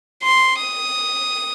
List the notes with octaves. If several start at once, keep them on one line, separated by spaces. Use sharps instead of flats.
C6
D#6